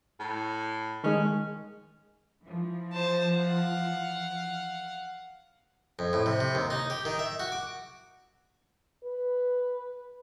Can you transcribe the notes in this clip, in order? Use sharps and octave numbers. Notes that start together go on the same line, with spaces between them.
A2
D#3 G#3 C#4
E3 F3
C5 A5
F5 F#5
F2
A2
C3
C3
D#2
D#4
G4
D#3
E5
F#4
D6
B4